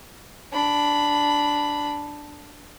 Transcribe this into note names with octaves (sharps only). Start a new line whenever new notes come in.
D4 B5